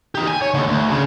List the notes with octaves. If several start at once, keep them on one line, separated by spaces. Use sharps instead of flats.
D#4 G4
G#5
C#5
D#2 D3
D2
C#3